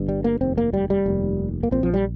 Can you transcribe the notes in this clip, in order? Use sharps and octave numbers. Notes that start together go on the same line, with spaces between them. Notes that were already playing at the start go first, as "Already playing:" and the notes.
Already playing: G1 G2
G3
A#3
F1 D#2 C4
A#3
G3
G3
F1 D#2
A#3
A#1 A#2 C4
F3
G3